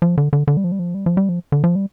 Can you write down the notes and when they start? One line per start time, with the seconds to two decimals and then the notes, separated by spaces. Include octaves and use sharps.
0.02 F3
0.18 D3
0.33 D3
0.48 D3
0.57 G3
0.64 F3
0.72 G3
0.79 F3
0.94 G3
1.06 F3
1.17 G3
1.29 F3
1.52 D3
1.64 F3
1.75 G3